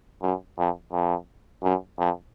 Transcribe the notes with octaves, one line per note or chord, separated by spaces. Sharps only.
F#2
F2
F2
F#2
F2